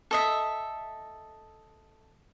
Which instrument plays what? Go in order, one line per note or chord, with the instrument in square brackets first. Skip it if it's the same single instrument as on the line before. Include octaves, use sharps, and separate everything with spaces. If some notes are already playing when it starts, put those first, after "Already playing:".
[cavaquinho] A4 D#5 E5